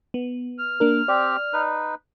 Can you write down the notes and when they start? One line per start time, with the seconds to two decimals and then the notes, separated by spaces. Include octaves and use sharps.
0.14 B3
0.59 F6
0.80 A#3 D4 A#4
1.08 C4 G4 D5
1.53 D#4 B4